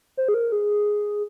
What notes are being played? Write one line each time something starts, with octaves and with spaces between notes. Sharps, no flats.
C5
G#4
A#4
G#4